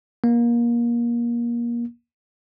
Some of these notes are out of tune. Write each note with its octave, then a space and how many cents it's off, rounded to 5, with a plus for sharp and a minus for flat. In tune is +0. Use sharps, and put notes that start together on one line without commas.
A#3 +25